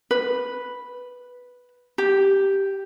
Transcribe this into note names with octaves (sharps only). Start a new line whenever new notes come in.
B4
G4